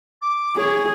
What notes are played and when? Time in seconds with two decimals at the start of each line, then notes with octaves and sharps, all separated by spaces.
0.21 D6
0.57 G#4 C#5